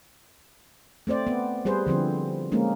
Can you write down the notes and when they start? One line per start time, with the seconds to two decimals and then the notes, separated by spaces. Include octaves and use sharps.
1.07 A3 C4 C5 D5
1.27 B3
1.65 G3 G#4 B4 C5
1.86 D3 F3 C4 E4
2.52 G#3 A#3 C#4 D#4